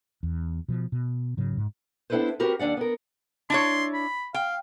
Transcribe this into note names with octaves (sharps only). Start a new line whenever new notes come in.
E2
B2 F3
B2
G#2 C#3 F#3
G#2
B3 D4 E4 A4 B4 C5
C4 F#4 G4 A#4 B4
D#2 G#2 D4 D5 F#5
B3 A#4
D4 E4 C#5 C6
B5
F5 G5